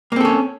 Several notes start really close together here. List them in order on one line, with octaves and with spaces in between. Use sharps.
A#3 C4 A4 C#4